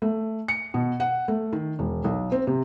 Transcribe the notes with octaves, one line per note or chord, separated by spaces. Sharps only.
A3
C#7
B2
F#5
A3
D#3
E1
B1
C4
C3